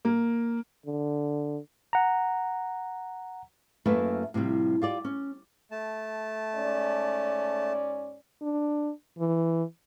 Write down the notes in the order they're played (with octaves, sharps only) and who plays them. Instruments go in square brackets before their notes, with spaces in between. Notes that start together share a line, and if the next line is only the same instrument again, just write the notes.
[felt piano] A#3
[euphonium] D3
[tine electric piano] F#5 A#5
[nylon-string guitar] F#2 A3 A#3 E4 B4 E5
A2 C3 F3 G3
F4 G4 D5
C#4
[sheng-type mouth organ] A3 A5
[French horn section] G#2 C#4 D5
[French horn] D4
E3